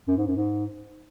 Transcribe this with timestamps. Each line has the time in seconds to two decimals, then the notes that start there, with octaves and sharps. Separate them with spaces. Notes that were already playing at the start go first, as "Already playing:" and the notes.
0.08 F#2
0.17 G#2
0.27 F#2
0.36 G#2